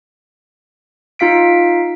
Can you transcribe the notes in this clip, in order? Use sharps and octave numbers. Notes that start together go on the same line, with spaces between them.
D#4 F4 F5 B6 D7